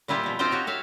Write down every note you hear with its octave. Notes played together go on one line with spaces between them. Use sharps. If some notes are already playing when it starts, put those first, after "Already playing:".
A#2 G3 E4 F4 G4
B2 F3
C4 D#4 F4 G4 C5 G5
F#4 G4 C#5
C#5 E5 F5